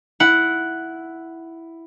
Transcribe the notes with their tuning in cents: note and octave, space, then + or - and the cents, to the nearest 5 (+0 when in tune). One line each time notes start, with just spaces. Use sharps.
E4 +0 F#5 +0